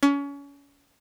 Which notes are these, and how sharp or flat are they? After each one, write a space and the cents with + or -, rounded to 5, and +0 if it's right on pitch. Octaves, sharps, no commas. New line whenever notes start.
C#4 +30